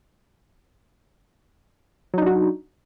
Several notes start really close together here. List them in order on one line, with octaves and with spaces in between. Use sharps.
F#3 D#4 D4 F#4